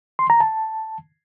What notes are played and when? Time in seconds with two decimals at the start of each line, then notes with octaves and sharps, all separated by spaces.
0.19 C6
0.30 A#5
0.40 A5